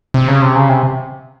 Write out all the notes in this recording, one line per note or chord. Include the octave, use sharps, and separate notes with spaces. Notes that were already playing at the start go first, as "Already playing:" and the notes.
C3
C#3
C3
C#3
C3